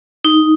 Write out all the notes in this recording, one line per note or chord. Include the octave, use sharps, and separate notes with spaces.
D#4